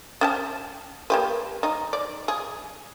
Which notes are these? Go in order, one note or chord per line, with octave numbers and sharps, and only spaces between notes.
C#4 G5 A5
A#3 G4 B4
D#4
D5
G#4